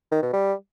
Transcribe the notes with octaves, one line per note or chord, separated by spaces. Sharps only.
D#3
B2
G3